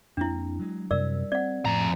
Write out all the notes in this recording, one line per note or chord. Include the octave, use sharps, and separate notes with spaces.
F2 A#3 C4 D4 E4
F#3 G#3
F#2 C3 G3 A#4 D5 E6
C4 D5 F#5
F2 A2 A#5